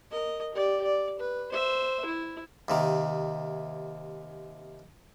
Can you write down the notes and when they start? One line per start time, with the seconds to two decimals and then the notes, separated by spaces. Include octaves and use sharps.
0.11 A#4 D#5
0.54 G4 D5
0.84 D5
1.19 B4
1.52 C5 E5
2.06 E4
2.68 D#2 C3 D#3